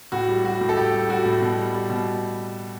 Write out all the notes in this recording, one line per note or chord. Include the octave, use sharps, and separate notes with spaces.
A2 F#4
G3
G3 F#4
A2
A4
A2 G4
G3
G3 F#4
A2
B2
G3
G3
B2